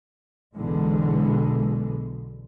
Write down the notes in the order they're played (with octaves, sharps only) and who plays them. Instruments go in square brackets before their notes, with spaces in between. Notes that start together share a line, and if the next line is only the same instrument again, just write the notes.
[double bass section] B1 E2 B2 D3 E3 G#3